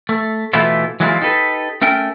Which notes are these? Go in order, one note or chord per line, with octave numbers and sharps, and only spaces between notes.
A3
B2 E3 A3 B3 E4 F4
E3 F#3 G#3 A#3 E4 F4
D#4 G4 A4 B4
A3 C#4 A#4 G5